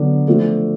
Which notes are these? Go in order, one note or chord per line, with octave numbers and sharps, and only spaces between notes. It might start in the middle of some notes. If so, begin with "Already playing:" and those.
Already playing: D3 F#3 B3 D4
F3 A3 D4